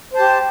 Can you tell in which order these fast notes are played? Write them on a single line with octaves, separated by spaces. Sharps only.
C5 A5 G4